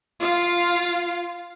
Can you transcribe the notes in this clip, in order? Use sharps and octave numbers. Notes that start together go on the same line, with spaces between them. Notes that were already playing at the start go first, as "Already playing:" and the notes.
F4 F5